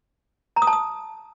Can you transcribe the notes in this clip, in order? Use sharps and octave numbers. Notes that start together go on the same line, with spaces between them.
A#5
D#6
A5
D#6